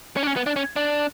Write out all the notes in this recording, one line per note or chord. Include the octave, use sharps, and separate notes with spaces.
C#4
D4
C#4
B3
D4
C#4
D4